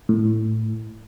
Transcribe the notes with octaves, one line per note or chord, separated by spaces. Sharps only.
A2